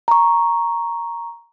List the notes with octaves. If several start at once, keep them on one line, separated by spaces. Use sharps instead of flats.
A#5 C#6